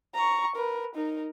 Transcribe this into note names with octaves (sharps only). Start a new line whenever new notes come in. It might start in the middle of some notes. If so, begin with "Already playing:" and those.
A#5 C#6
A#4 B4
D#4 A#4